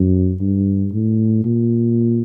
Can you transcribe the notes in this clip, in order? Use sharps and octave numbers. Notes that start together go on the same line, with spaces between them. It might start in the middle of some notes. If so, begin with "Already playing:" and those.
Already playing: F#2
G2
A2
A#2